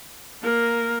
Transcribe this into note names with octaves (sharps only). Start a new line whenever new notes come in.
A#3 A#4